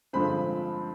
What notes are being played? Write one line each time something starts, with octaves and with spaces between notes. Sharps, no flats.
G2 D3 F3 G#3 C4 B5